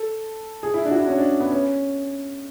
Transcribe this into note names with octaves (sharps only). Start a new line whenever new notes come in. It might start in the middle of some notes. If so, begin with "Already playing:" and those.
Already playing: A4
G#4
E4
D4
F#4
E4
C#4
D4
B3
C#4